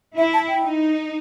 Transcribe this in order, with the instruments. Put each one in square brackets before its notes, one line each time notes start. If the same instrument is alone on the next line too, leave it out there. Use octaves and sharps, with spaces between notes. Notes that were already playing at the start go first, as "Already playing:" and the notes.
[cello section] E4 [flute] E5
[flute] A5
G5
[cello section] D#4